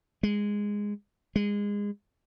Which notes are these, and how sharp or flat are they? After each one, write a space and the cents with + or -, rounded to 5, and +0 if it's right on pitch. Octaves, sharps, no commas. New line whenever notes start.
G#3 -10
G#3 -25